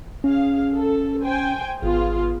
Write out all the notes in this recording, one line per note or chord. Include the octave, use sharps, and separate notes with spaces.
C#4 G#4 F5
A4
C5 G5 G#5
G#1 B3 F4 G#4